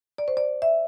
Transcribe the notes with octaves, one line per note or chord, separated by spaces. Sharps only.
D5
C5
D5
E5